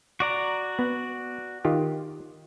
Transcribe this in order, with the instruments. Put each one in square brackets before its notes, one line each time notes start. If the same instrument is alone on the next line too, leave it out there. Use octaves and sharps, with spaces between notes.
[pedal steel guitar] F#4 D5 A#5
[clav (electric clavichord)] B3
D#3 F4 G4